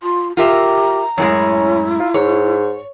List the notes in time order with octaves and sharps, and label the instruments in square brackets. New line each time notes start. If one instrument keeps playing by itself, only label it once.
[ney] F4 [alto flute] C6
[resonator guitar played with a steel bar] F4 A#4 E5 [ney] G4 [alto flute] A#5
[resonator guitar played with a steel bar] F#2 A2 G#3 [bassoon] C#4 [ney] E4
[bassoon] F4
[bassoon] G#2 [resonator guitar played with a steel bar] C#5